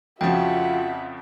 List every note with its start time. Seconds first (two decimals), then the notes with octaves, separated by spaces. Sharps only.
0.21 F2 C#3 F3 F4 F#4 E5 F#5 G5